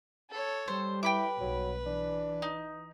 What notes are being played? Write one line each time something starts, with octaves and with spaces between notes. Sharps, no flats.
A4 C#5
G3 C5
E4 B4 G5 B5 D6
B1 F#3
E3 D4
D#4